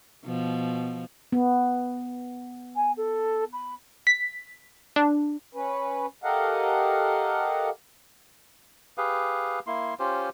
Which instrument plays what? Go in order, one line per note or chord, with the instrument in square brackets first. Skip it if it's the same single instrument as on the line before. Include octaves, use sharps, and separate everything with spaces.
[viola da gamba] B2 F3
[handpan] B3
[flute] G#5
A4
B5
[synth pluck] B6
D4
[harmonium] C#4 B4
G4 A4 A#4 D#5 F5 F#5
[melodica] G4 G#4 B4 F5
A#3 E4 C6
C#4 F4 G4 C5